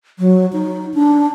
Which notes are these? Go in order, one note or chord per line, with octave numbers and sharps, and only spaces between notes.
F#3
D#4
D4